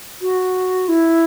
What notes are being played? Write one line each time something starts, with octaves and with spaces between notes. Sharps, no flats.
F#4
E4